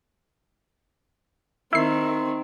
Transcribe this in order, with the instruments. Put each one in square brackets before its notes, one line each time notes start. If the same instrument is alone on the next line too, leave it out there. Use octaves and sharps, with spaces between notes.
[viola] D#3 C4 [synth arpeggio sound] E4 C7